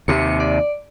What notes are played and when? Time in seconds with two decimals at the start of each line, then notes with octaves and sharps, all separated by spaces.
0.08 D#2 C3 C#7
0.40 D5